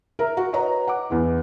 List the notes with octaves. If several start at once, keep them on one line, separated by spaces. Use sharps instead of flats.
A#4 E5 A#5
F#4
B4 C#5 D#5 A#5
F#5 D6
E2 B3 E4